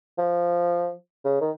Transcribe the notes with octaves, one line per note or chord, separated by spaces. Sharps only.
F3
C#3
D#3